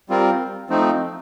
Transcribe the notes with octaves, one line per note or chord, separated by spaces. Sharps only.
G3 C4 F4 A#4
F3 A3 C4 D#4